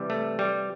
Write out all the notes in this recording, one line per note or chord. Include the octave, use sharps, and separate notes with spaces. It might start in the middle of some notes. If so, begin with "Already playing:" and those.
Already playing: C3 E3 G3
A3
G3